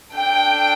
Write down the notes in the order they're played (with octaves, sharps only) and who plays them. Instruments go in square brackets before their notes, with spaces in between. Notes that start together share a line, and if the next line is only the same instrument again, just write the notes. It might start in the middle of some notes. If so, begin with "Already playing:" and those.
[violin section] D4 A4 G5